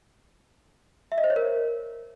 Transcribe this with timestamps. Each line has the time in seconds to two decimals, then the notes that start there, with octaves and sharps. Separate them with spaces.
1.12 E5
1.18 D#5
1.24 C5
1.30 C#5
1.36 A#4